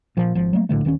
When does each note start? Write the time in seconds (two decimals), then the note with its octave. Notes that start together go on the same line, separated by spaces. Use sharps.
0.17 A#2 F3
0.35 G#1 F3
0.53 F#3 A3 A#3
0.69 A#1 A2 D3 A3
0.85 D#1 D#3 B3 C#4